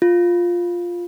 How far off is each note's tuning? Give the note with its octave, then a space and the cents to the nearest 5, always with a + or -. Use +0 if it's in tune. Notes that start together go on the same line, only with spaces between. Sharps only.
F4 +5